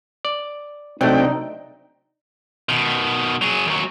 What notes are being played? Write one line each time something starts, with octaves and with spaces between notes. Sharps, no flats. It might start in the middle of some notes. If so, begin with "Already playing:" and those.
D5
C3 F#3 A3 C4 D4 D#4 D5 G5
B2 D#3
F#3 G#4
D#2 F#3